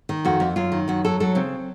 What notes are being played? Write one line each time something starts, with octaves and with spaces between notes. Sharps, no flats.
D#3
F2 F#4
F2
F#2 F4
D#3
F#2 F#4
F#3 A4
F#3 A4
C#3 C4